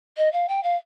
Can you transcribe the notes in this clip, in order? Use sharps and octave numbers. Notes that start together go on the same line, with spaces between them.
D#5
F5
G5
F5